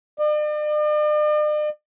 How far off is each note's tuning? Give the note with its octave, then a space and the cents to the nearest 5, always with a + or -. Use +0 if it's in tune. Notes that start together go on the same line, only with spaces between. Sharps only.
D5 +45